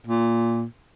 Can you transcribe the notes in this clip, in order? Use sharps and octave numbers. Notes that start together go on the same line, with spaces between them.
A#2